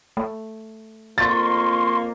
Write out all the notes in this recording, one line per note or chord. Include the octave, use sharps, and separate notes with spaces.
A3
F2 A#3 C6 C#6 A6